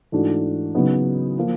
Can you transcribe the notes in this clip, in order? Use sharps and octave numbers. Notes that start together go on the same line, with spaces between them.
G#2 E3 A3 D4 F#4
C#3 F#3 B3 D#4
F3 A#3